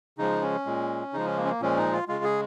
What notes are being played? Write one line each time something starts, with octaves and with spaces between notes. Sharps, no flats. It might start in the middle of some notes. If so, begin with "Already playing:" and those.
C#3 F3 G#3 D#4
C#4
A#2 G#3
C#3 F3 G#3 D#4
C#4
A#3
C#4
A#3
A#2 F3 G#3 C#4
D#4
F4
C#3 G#3 F4
G#4